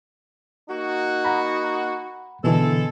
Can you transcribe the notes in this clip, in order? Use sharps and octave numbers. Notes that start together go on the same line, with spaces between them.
A#3 D#4 F#4
F#5 A#5 B5
B2 D3 E3 G#3 B3 A4